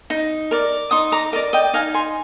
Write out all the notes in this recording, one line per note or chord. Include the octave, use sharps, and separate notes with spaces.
D#4
A#4 D5
D#4 C6 D#6
A#5 D6
A#4 D5 D#5
D#5 G5
D#4 F5 G#5
G#5 C6